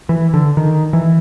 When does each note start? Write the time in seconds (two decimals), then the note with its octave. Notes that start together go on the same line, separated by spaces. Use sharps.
0.09 E3
0.34 D3
0.57 D#3
0.93 E3